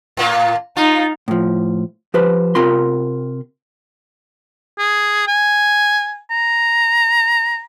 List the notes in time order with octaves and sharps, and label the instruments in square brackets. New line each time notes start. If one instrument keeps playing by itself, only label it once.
[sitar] A2 A#3 F4
[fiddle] D#4 [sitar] F4
[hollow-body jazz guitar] A2 F3
F3 G4 B4 C5
C3 C4 F4 A#4 B5 C6
[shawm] G#4
G#5
A#5